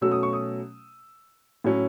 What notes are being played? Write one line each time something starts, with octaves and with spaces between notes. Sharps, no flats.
B2 F#3 A3 C#4 E6
D#6
C#6
D#6
A2 F#3 C#4 E4